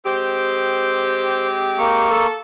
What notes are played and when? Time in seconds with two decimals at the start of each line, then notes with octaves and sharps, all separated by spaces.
0.06 G#3 C4 G4 C5
1.78 A#3 C#6
2.11 A4